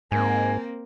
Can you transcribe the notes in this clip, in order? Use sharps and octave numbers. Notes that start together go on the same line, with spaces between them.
G#2 A#3 C4 G#5